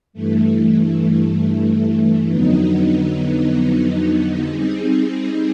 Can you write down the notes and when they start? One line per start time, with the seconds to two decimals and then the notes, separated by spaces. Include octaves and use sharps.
0.13 G2 E3 A3
2.29 F2 D3 F#3 B3 D#4
4.46 G3 C4 D#4 G#4